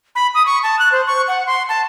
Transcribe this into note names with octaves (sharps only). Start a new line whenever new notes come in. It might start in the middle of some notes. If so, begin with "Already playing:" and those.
B5
D#6
C#6
A5
F#6
C5
C#6
F#5
C6
A5